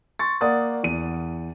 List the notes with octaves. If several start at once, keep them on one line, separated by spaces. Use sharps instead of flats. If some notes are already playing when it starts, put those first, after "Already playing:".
C6 C#6 A6
A#3 D5 F#5 D#6 A6
E2 D#7